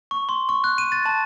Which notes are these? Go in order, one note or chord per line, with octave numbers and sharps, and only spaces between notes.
C#6
C6
C#6
F#6
D#7
A6
A5